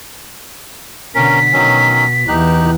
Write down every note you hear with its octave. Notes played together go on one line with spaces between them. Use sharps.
B2 D3 C#4 A#4 B6
B2 D#3 F#3 C#4
E2 E3 D#4 G4 F#6